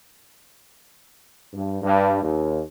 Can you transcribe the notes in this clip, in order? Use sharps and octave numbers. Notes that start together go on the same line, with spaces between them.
G2
G2
D#2